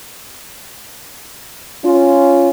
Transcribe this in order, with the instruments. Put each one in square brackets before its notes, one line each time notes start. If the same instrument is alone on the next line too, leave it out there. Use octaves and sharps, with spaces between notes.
[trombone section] C#4 F4